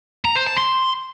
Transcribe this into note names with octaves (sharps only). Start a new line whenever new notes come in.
A#5
C5
A5
C6